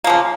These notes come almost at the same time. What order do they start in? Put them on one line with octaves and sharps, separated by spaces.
A#3 F3 C#3